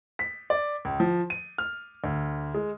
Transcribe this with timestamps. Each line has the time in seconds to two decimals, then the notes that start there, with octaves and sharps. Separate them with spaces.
0.19 B6
0.50 D5
0.85 C#2
1.00 F3
1.30 D#7
1.58 F6
2.04 D2
2.54 G#3